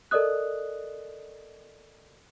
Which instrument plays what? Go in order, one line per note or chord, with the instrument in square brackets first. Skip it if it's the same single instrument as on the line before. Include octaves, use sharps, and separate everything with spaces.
[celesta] A4 A#4 D5 D#5 D#6 F#6